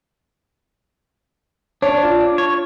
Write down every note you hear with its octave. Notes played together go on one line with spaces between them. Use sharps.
D4 C#5
F4
C#5